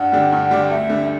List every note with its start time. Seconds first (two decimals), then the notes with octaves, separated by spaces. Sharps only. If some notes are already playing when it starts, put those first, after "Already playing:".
Already playing: G2 F#5
0.12 D3 G3 D4 G4
0.32 G2
0.51 D3 G3 D4 G4
0.70 D2 E5
0.89 D3 G3